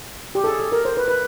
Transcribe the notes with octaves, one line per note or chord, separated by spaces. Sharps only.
G4
A4
G#4
A4
A#4
C5
B4
B4